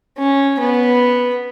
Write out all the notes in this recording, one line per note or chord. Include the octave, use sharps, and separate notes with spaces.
C#4
B3